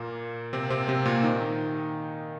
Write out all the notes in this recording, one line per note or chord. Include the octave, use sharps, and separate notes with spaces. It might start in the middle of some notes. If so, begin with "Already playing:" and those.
Already playing: A#2 A#3
C3 C4
C3 C4
C3 C4
A#2 A#3
D#3 D#4